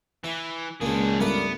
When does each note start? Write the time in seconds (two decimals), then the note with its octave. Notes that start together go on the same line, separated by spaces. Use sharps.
0.24 E3 E4
0.81 C#2 G#3 A#3 D4 G#4
1.20 G2 A3 B3 A#4 D5 D6